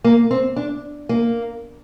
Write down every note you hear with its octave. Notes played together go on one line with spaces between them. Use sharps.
A#3
C4
D4
A#3